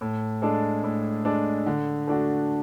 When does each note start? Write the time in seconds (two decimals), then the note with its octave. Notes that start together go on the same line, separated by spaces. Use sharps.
0.01 A2
0.42 G#3 D4 A4
0.84 A2
1.25 G#3 D4 A4
1.66 D3
2.07 A3 D4 F#4